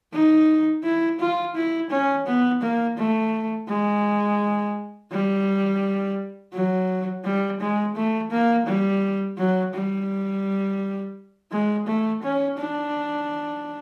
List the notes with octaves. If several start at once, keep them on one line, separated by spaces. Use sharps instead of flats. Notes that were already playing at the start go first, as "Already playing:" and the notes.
D#4
E4
F4
E4
C#4
B3
A#3
A3
G#3
G3
F#3
G3
G#3
A3
A#3
G3
F#3
G3
G#3
A3
C#4
D4